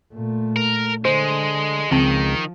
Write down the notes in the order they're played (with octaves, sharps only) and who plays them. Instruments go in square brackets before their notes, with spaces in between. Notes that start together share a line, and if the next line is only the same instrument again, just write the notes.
[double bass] A#2 A3
[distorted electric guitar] A#4
[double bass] D3 [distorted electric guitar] G#3 [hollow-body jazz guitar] C5
[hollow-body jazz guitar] C#2 C4 A5 [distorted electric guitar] D#3 [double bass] F3